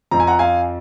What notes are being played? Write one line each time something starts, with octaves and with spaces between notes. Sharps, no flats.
F2 F3 A#5
G#5
F#5 A#5
F5 G#5